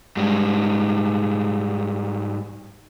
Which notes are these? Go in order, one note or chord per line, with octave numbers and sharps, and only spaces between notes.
G#2 G3